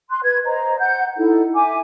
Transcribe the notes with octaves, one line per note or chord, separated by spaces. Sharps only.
C6 F#6
B4 G#6
C5 D#5 A#5
F#5 G6
D#4 E4 A4
E5 G#5 D6